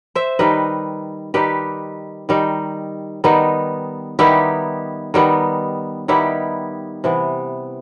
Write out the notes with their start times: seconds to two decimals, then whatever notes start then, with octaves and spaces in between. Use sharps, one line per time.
0.15 C5 E5
0.39 D#3 G3 D#4 B4 D#5
1.34 D#3 G3 D#4 G4 B4
2.29 D#3 G3 D#4
3.24 D#3 G3 B3 D#4
4.19 D#3 G3 B3 D#4 E4 G4
5.14 D#3 G3 B3 D#4
6.08 D#3 G3 B3 D#4 E4 G4
7.04 C3 E3 B3